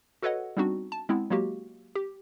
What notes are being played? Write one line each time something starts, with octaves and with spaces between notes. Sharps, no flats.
F#4 A4 B4 C#5 D#5 F#5
G3 B3 C4 D4 D#4 F#4
A5
G#3 B3 C4 E4
F#3 G#3 A#3 F#4 G4
G4